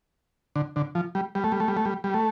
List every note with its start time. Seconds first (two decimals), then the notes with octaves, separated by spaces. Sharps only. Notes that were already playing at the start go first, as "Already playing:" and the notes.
0.56 D3
0.76 D3
0.95 F3
1.15 G3
1.35 G3
1.44 A3
1.52 G3
1.60 A3
1.68 G3
1.77 A3
1.85 G3
2.04 G3
2.14 A3